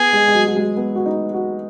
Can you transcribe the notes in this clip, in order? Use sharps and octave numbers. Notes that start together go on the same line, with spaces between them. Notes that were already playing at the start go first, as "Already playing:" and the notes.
Already playing: B3 G#4
G#3
G#3
F#3
F#3
G#3
B3
F#4
D#4
F#4